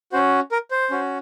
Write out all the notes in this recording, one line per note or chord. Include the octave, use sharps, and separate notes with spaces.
C#4 F#4 C5
A#4
C5
C#4 F#4